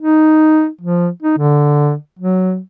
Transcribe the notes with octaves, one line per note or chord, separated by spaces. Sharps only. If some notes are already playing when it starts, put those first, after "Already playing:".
D#4
F3
D#4
D3
F#3